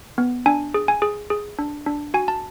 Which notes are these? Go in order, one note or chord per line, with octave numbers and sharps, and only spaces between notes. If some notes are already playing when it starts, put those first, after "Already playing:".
B3
D4 G#5
G#4
G#5
G#4
G#4
D4
D4
F#4 G#5
A5